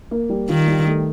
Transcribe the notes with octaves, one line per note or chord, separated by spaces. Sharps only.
A#3
G3
D#3 F4
G3
A3